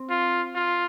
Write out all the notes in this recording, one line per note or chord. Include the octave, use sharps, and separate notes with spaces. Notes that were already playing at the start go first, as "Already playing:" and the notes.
Already playing: C4
F4
F4